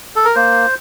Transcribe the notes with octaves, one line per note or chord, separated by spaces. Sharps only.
A4
A#4
A#3 C5